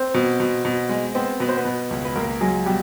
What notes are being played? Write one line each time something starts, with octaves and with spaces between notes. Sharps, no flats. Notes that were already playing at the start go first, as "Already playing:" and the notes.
Already playing: C4 C5
B2
B2
B2
G#3
B3 C4 C5
B2 B4
C5
B3 B4
B2
C#2
B4
C#2 A#3 A#4
F#3 G#3 G#4
B2 G3 G4